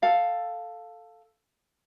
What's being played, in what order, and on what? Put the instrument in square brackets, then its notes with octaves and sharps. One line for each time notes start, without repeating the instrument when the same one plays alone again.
[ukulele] A4 F5 G5